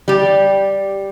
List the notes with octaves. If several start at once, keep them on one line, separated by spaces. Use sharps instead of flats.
G3 G4